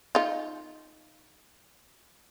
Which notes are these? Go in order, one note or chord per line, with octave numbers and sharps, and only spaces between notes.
D#4 F4